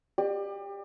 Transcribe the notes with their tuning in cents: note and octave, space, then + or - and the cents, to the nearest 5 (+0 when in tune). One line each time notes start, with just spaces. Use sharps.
G4 +25 D5 +40